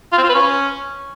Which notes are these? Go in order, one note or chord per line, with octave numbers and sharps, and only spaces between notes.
F4
C4
F4
B4
C#4